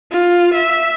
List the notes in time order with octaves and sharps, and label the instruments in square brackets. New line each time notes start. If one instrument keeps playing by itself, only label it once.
[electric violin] F4
E5